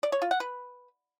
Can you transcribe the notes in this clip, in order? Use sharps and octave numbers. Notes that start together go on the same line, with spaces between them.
D5
C#5
F4
F#5
B4